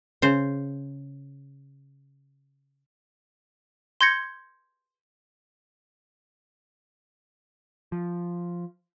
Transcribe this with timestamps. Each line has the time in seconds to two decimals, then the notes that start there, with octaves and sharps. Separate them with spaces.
0.22 C#3 C5
4.01 C6 G6 G#6 A#6 C#7
7.92 F3